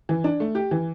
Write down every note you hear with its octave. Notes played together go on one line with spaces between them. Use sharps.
E3
D4
A3
G4
E3